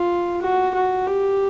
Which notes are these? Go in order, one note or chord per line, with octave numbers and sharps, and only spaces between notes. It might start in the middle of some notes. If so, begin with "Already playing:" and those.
Already playing: F4
F#4
F#4
G4